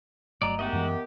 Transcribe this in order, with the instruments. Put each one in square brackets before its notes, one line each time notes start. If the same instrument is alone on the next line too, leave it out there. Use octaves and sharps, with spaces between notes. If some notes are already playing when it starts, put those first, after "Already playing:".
[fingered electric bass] G1 [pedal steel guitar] F#3 D5 [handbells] A3 D#5 A#5
[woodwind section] D#3 B3 G4 [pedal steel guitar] G#3 F#4 D#5 [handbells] E5
[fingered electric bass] F#2 E3